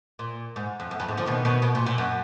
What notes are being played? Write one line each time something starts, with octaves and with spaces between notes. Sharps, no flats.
A#2
G#2
F2
F#2
F2
G#2
D3 F3
B2 D#3
B2 D#3
B2
A#2
A#2
F#2